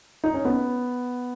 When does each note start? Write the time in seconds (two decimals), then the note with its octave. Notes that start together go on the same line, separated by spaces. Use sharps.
0.24 D#4
0.34 C#4
0.45 B3